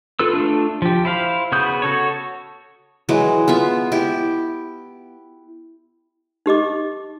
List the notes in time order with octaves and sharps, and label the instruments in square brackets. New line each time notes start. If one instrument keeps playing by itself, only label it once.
[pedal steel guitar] F4 A4 B4 E6
A3 D4 F4
F3 G4
E4 C5 F5
C#3 B3 F#4 D#6 G6
F#4 A4 C#5
[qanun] E3 F#3 G#3
B3 F4 E5
E4 G4
[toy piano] D#4 G4 D#5 D6